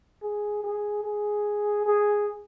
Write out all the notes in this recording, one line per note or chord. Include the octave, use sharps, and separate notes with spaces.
G#4
G#4
G#4
G#4